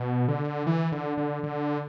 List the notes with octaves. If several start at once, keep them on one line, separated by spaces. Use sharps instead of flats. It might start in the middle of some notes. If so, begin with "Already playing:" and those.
Already playing: B2
D3
E3
D3
D3
D3